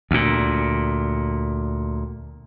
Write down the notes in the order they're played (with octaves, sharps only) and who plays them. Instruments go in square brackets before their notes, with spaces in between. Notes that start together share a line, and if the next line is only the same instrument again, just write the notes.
[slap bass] D2 A#2